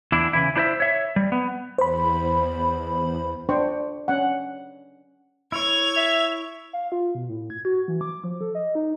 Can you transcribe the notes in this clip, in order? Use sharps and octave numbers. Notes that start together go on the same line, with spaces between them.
E2 D4 E4
C#3 E3 E4
D4 E4 C5 D5 E5
C#5 E5
G3
B3
E2 C5 B5
D4 C5 G5 C#6
C#4 F#5
E4 C#5 G#6 F7
E5
F5
F4
B2
A2
G#6
F#4
E3
D6
F3
A4
D#5
D#4